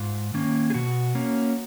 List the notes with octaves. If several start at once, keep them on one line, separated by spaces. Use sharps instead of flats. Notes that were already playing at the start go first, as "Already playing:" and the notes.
Already playing: G#2 F4
D#3 A#3 C#4
G#4
B2 F#4
A#3 C#4